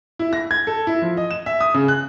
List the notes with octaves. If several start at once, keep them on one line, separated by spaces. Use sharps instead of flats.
E4
A#6
G#6
A4
E4
F3
D#5
E7
E5
D#6
C#3
F#6